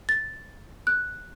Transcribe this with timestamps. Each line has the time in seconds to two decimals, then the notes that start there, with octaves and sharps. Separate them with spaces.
0.09 A6
0.87 F#6